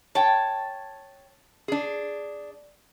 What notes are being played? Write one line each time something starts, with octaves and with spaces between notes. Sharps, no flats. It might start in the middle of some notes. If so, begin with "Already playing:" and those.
C#5 G5 A5
D4 G#4